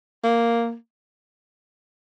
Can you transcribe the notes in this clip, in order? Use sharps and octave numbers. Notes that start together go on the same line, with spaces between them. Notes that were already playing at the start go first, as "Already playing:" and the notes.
A#3